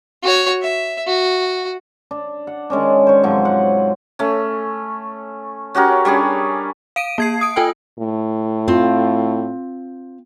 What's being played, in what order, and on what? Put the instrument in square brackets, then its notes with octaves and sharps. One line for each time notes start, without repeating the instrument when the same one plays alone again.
[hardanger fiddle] F#4 C#5
E5
F#4
[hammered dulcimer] D4
F#5
D#3 G#3 C#4 D4
C5 C#5
G#2 C3 F3 F#3
F#5
A3 C#4
C#4 F#4 G4 A#4
G3 C#4 D4 G#4
[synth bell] F5 D7 D#7
A#3 G#6 C7
D#6 D7
F4 A4 G5 G#5
[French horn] A2
[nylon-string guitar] C4 F4